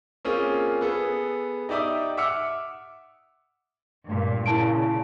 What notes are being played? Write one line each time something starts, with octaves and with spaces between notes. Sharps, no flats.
A#3 C4 C#4 F4 G#4
B3 G#4 A4
D#4 G4 D5 E5 D6 D#6
E5 F#5 D6 E6 F6 C#7
G2 A#2
A#2 C#3 E4 A5 D7